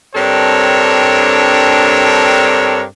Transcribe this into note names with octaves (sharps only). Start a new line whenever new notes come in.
G2 C4 D4 A4 A#4 C#5